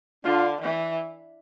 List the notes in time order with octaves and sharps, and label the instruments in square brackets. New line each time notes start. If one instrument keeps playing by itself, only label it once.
[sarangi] D3 [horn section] D4 F4
[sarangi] E3